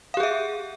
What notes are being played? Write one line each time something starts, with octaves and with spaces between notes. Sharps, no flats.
G4 G#4 E5 F5